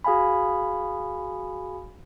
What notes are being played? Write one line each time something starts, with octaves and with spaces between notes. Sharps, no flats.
F#4 G#4 F5 G#5 B5